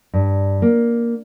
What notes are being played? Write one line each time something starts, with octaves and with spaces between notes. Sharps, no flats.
G2
A#3